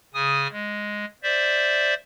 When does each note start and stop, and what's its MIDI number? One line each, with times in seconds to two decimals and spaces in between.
0.14 0.48 49
0.14 0.48 80
0.14 0.48 87
0.52 1.05 56
1.23 1.94 72
1.23 1.94 74
1.23 1.94 76